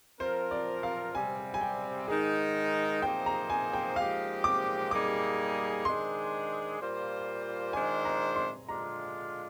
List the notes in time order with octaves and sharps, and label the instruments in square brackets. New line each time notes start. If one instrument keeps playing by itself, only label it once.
[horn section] F3 C4 F4 A#4 [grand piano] C5
[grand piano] D5
F5
[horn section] C3 G3 C4 [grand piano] G#5
[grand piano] G#5
G5
[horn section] G#2 D#3 G#3 D#4 [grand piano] G#4
[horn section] F3 A#3 D#4 G#4 C5 [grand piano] G5
[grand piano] A#5
G#5
G5
[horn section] A#2 F3 G#3 D#4 G4 [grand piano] F5
[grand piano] D6
[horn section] G3 A#3 D#4 G#4 [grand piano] D6
[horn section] D#3 G#3 D4 G#4 C5 [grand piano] C6
[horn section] A#2 G3 A#3 F4 C5
[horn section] D#3 G#3 D4 F4 C5 [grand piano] G#5
[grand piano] A#5
C6
[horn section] D3 G#3 D4 F4 [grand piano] A#5